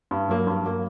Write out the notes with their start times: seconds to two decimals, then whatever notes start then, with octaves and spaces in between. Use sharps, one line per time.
0.11 G2
0.29 F#3 A#3
0.47 G2
0.64 F#3 A#3